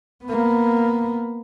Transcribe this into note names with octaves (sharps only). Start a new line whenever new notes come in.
A#3 B3